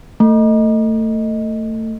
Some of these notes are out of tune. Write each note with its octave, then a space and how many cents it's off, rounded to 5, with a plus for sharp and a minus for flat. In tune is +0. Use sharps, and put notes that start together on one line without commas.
A3 +25